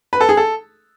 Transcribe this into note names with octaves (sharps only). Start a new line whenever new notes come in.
B4
A4
G#4
A4